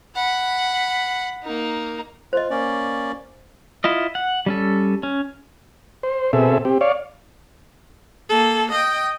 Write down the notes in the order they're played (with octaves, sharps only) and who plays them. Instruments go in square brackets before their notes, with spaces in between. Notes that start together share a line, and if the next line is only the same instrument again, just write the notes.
[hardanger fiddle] F#5 B5
A#3 D#4
[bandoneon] F4 [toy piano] C5 D#5
[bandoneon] A#3 C#4 D5
[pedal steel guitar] E4 F4 D#5
F#5
G3 C#4 A4
C#4
[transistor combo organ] C5
B2 C4 G#4 A4 E5
C4 G4
C#5 D5 F5
[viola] A#3 A4
D#5 G5